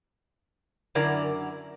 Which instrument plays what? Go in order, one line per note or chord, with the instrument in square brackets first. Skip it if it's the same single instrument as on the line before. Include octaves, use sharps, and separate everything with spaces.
[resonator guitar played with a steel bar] F#2 D3 E4 A#4 D5